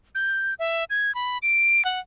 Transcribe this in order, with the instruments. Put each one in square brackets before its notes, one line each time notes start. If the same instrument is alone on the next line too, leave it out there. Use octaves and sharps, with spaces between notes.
[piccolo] G6
E5
G#6
B5
D7
F#5